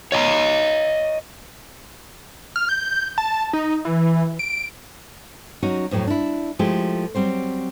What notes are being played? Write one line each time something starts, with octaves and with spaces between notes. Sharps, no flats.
C#5 D#5 G#5 A#5
F6
G6
A5
D#4
E3
D7
F#3 C#4 D#4 F#4
F2 A2 E3 F#3
D4 E4
F3 G#3 A3 E4 G4
F#3 G3 C4 C5